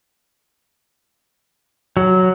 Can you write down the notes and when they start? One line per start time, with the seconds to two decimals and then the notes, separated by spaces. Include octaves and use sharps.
1.97 F#3